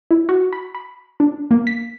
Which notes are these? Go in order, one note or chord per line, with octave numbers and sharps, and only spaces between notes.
E4
F#4
B5
B5
D4
A#3
B6